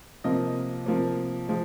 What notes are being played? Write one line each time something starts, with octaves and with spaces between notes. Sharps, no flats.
C3 F3 A#3 D#5
C3 F3 A#3
F3 G#3